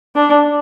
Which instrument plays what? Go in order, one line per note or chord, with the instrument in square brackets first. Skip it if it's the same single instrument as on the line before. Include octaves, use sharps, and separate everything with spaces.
[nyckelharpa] D4